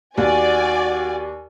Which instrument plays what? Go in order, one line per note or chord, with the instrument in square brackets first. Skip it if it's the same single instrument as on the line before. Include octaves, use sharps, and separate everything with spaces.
[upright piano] D#2 [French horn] F#4 [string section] D5 G#5